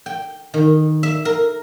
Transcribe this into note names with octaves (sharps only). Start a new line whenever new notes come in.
G5
D#3
E5
A#4